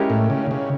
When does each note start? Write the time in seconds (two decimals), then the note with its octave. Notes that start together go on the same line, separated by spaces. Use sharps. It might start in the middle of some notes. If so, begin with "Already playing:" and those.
Already playing: G#3 C#4 E4 G4 A#4
0.10 A2
0.30 C#3
0.51 C#3